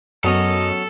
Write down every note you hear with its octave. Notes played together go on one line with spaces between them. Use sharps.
F#2 F#3 B3 C#4 A4 D#5